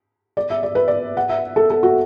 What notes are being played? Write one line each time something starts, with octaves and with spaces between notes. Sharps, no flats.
D5
E5
D5
B4
D5
F#5
E5
A4
A4
F#4